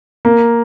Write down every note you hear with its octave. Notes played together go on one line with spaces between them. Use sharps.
A#3